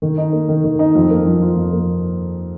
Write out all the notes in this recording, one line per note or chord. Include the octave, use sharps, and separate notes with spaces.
D#3
D#4
A#3
D#3
D#3
D#4
F2
A#3
F3
F4
F2
A#3